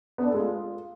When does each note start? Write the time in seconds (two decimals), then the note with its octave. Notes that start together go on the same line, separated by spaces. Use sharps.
0.18 B3
0.24 D4
0.29 A4
0.34 G#3
0.40 F4